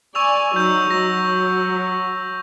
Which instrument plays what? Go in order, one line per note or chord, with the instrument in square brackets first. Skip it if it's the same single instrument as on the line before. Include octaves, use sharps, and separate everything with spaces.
[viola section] D5 G#5 [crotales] C#6 E6 F7
[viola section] F#3 D#4 [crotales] E6 G6
[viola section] F#3 [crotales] A#6